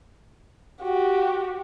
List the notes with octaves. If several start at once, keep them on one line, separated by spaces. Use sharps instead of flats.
F#4 G4